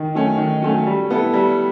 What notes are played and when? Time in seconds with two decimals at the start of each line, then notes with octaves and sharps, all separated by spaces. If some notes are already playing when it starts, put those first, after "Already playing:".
Already playing: D#3
0.15 F#3 A3 C#4
0.38 D#3
0.62 F#3 A3 C#4
0.86 G3
1.10 B3 E4 A4
1.34 G3